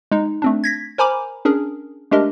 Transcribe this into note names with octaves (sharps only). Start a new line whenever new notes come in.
G#3 D#4
A3 C4 D4
G#6 A#6 B6
A#4 C5 G#5 A#5 B5 D6
C#4 D4 G#4 A#4
G#3 A3 D4 G4 A#4 D#5